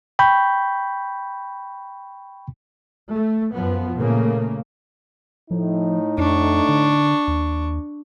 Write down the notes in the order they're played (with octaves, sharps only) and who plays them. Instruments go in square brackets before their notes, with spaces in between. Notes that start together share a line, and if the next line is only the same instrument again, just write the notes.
[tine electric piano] G5 B5 C#6 G6
[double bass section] A3
F#2 F3 B3
A#2 C#3 A3 A#3
[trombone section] A2 D#4 [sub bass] F3
[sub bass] F2 [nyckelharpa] D4 C#6
[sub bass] D3
D#2